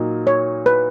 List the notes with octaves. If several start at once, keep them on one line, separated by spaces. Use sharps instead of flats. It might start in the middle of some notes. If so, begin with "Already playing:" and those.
Already playing: A#2 F#3 A#3 D#4
C#5
B4